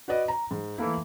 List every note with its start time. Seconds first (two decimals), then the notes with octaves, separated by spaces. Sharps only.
0.08 F#4 B4 D5 D#5
0.28 A#5
0.51 G#2
0.78 E3 A3 A#3 E4